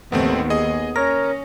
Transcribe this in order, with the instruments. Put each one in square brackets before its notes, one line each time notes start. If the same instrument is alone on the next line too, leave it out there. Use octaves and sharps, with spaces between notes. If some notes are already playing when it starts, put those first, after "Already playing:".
[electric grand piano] A1 A3 C4 [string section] D#2 [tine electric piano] B3
[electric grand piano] G#4 D#5 D#6
[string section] C#4 [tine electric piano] A#4 C#5 [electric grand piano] A#6